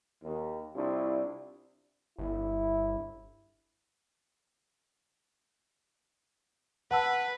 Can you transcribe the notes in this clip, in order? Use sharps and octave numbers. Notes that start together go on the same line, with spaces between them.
D#2
C2 D4 E4 F4
G1 E4
B4 F#5 A5 E6